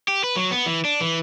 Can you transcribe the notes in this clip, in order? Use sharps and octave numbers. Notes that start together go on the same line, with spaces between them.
G4
B4
F#3
B3
E3
D4
E3